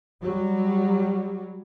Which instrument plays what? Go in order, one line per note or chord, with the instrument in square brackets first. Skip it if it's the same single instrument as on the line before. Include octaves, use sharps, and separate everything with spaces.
[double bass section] F#3 G3